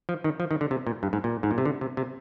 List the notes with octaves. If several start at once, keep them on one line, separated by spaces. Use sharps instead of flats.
F3
D#3
F3
D#3
D3
C3
A#2
G2
G#2
A#2
G#2
A#2
C3
D3
C3
C3